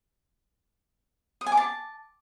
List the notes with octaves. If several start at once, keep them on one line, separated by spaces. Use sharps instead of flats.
D#6
G#5
D6
A5